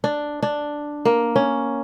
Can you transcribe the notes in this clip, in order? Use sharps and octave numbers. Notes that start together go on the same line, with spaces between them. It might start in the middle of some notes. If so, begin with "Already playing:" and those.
D4
D4
A#3
C#4